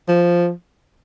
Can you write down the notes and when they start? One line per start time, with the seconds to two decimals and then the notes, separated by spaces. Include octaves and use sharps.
0.08 F3